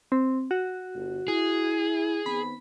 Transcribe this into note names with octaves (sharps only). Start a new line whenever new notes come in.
C4
F#4
G1
E4 G#4
D#3 B3 C4 B5